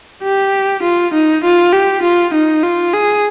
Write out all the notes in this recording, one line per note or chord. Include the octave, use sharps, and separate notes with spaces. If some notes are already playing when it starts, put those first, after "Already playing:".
G4
F4
D#4
F4
G4
F4
D#4
F4
G#4